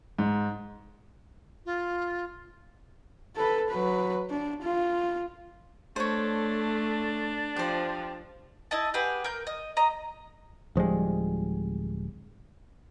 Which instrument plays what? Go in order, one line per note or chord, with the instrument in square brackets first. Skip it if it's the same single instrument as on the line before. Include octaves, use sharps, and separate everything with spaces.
[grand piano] G#2
[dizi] F4
[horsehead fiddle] A4 B4
F#3 B4
D4
F4
[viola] A3 [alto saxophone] D4 [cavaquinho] C5 C#5
[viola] F3 [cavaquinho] G4 C5
[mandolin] E4 D#5 A5
G4 G#4 B4 F#5
A#4 G6
D#5
D#5 A#5
[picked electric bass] D1 F3 G3 G#3